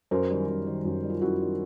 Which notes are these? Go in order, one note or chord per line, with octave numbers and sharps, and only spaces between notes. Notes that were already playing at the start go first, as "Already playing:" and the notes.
F#2 A#4 C5
D#3 G3
F#2
D#3 G3
F#2
D#3 G3
F4
F#2 E4 F#4
D#3 G3